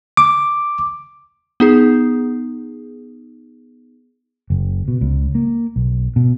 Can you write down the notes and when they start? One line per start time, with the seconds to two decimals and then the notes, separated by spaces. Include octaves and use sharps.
0.17 D6
1.60 B3 D#4 G#4
4.50 F#1
4.88 B2
5.01 C#2
5.35 A#3
5.76 B1
6.16 B2